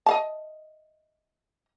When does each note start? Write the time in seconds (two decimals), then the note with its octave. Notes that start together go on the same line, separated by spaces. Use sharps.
0.06 D#5 F5 A5